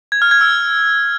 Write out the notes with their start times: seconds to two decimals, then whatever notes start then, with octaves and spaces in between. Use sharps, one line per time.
0.12 G#6
0.22 F6
0.31 G#6
0.41 E6